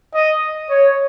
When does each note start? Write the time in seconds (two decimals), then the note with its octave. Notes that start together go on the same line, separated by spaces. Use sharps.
0.14 D#5
0.70 C#5